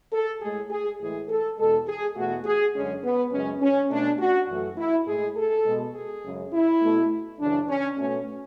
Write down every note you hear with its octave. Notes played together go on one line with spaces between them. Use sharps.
A4
A2 G#3 G#4
G#4
A2 E3 G#3 G#4
A4
E2 B2 G#3 A4
G#4
E2 B2 A3 F#4
G#4
F#2 D3 G#3 C#4
B3
F#2 C#3 G#3 C#4
C#4
B2 A3 D4
F#4
F#2 E3 A3
E4
A2 G#3 G#4
A4
B2 G#3
G#4
F#2 C#3 G#3
E4
B2 A3
F#2 C#3 E3 D4
C#4
B2 A3 C#4